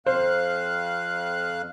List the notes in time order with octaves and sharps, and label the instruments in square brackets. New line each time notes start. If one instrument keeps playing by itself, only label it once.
[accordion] F2 F5 F#6 [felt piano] C5